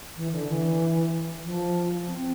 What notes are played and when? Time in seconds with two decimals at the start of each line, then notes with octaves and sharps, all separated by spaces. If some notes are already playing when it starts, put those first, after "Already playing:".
0.16 E3
0.32 D3
0.48 E3
1.45 F3
2.08 C4